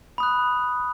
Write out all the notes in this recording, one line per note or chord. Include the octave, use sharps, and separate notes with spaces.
B5 D#6 F#6